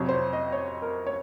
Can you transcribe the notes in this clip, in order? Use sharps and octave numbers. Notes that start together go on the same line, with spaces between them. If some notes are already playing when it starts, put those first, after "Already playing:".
Already playing: F2 C3 F#3 C#5
C5
C#5
D#5
C#5
A#4
C#5